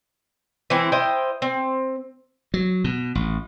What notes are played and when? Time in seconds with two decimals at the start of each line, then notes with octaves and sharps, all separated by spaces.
0.70 E3 G#3 C4 E4
0.92 E4 C5 D#5 G5
1.42 C4
2.54 F#3
2.84 B2
3.15 A1